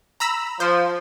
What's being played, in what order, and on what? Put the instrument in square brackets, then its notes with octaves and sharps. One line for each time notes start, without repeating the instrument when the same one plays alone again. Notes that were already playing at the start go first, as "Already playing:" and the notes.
[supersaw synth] A#5 B5 E6
[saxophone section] F3 [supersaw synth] C5